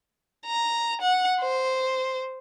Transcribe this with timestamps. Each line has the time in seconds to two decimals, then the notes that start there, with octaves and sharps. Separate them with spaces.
0.46 A#5
1.01 F#5
1.40 C5